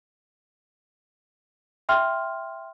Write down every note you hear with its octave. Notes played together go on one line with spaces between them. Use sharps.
E5 G5 C6 F6